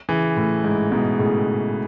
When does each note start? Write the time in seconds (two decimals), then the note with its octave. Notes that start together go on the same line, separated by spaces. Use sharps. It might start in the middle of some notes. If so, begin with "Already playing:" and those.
0.09 C#3 E3
0.36 A2
0.64 G#2
0.92 G#2 B2
1.19 A2 C#3